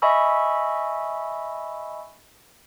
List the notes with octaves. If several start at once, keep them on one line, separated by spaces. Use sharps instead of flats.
D#5 E5 G#5 B5 C#6 E6